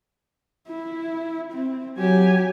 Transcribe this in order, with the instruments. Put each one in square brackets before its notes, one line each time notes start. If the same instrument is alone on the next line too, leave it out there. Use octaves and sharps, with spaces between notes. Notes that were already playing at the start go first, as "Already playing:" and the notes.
[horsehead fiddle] E4
C4
[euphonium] F#3 [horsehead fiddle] G4 G#5